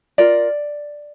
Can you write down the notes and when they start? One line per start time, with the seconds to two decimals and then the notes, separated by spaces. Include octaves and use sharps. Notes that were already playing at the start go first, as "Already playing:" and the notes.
0.18 F4 A#4 D5